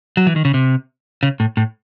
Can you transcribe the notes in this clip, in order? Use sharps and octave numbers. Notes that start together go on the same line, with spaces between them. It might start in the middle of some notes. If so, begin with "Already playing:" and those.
F#3
E3
D#3
C#3
C3
C#3
A2
A2